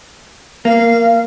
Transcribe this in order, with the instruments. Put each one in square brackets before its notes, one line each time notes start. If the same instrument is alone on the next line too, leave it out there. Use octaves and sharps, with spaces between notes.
[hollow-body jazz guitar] A#3 [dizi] F5